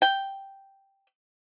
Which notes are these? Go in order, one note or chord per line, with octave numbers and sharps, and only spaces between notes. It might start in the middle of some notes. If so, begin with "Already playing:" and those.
G5